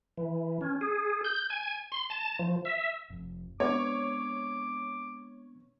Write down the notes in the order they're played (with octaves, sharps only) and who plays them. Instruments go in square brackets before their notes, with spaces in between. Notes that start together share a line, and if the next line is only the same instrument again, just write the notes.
[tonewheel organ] E3
C#4
G#4
G6
G#5
C6
A5
F3
E5
[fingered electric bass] F1
[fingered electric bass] G#3 [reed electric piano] B3 C4 D4 [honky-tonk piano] C#5 [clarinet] D6